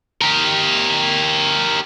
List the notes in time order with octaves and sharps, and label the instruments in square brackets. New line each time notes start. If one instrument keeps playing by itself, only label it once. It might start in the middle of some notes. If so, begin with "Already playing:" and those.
[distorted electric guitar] G4 A#4